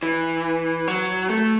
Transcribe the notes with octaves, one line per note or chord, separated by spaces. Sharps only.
E3
F#3
A3